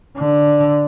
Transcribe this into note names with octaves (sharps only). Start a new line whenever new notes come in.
D3